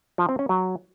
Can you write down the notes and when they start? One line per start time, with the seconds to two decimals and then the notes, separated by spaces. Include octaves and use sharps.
0.18 F3
0.29 C4
0.39 C#4
0.49 F#3